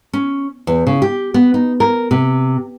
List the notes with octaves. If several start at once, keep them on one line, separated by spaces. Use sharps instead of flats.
C#4
E2
C#3
G4
B3
D#4
A#4
C3